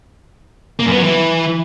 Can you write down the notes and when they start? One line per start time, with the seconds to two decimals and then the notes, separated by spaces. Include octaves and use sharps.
0.79 A#3
0.85 F#2
0.91 B3
0.97 F#3
1.03 E3